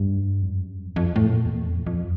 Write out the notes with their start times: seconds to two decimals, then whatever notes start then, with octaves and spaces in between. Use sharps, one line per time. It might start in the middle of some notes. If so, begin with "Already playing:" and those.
Already playing: G2
0.42 F2
0.47 F#2
0.86 F2
0.96 F2
1.16 A2
1.27 A#2
1.46 E2
1.66 F2
1.87 F2